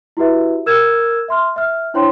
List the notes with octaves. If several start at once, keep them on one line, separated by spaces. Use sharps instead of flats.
E4 F#4 G4 B4 E5
A#4 E6 F6 G#6 E7
E5 C6 F6
E5 F6
D4 E4 C5 C#5 G5 C6